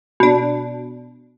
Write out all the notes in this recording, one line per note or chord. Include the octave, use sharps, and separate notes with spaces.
B2 D4